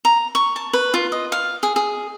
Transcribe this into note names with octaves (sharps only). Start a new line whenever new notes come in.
A#5
C#6
A5
B4
F4
D#5
F5
G#4
G#4